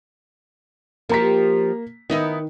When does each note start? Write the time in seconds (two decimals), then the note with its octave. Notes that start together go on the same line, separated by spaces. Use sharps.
1.09 F3 A#3 G4 A#5 B6
2.10 D#3 B3 D#4 E4